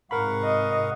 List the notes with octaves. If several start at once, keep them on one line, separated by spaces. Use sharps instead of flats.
G#2 C3 A#4 F5 F#5 B5 C#6
D#5